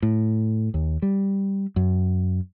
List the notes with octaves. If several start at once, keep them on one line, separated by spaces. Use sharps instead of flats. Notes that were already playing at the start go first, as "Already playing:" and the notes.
A2
D#2
G3
F#2